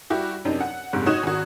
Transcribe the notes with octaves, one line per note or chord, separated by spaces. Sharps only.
G3 E4 F#4 G4
F#2 C3 D4 D#4
F#5
F#1 G#2 C3 F#6
D#4 F#4 C#5 D#6 G#6 E7
G#1 F#4